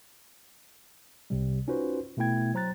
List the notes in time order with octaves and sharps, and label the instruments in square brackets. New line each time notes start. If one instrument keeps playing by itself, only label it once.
[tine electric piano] C2 C3 G3
C#4 D#4 F4 F#4 B4 C5
B2 A3 B3 E4 G5 G#6
F#3 C5 A#5 F#6 A6